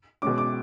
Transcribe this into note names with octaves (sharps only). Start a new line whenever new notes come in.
B2 G#3 C#4 D6
D6